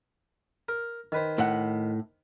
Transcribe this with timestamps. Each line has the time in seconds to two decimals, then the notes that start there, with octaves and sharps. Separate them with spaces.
0.69 A#4
1.12 D#3 B4 C5
1.38 A2 F#5